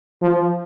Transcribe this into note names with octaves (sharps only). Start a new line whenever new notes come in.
F3